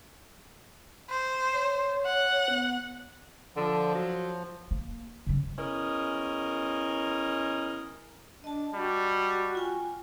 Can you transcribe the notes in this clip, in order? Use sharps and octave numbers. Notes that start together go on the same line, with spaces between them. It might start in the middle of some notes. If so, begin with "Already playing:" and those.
C5
C#5
F#5
B3
D3 F3
F#3
A#3
C#3 G3
E2 C#4 A#4 D#5
D4 D#5 A5
G3 F#4
F4 G5 G#5